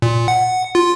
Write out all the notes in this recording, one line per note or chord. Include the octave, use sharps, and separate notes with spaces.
A#2
F#5
F4